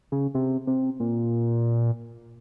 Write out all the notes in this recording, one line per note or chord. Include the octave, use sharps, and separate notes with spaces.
C#3
C3
C3
A#2